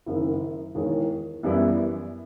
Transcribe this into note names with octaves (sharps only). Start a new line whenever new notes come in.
F#1 F#2 D#3
E1 E2 D#3
F#2 E3 G3 B3 E4